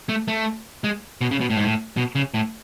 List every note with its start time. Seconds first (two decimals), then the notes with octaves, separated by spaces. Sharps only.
0.09 A3
0.28 A3
0.84 G#3
1.21 B2
1.31 C#3
1.41 B2
1.50 A2
1.57 G#2
1.64 A2
1.97 B2
2.15 C#3
2.34 A2